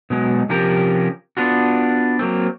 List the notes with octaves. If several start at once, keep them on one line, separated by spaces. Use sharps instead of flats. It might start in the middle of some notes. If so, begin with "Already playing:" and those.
B2 F#3 G#3
C3 F3 C#4 G4 A#4
B3 D4 F4 F#4
F#3 A#3 C4